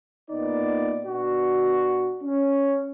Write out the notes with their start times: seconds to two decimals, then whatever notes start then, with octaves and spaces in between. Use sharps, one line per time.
0.30 A#2 B3 D#4 D5
1.03 B2 D4 F#4
2.22 C#4